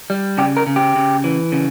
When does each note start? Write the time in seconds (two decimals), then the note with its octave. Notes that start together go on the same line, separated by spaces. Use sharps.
0.10 G3
0.38 C#3 G4
0.56 A#4
0.67 C#3
0.76 G4
0.96 C#3
1.24 E3
1.52 C#3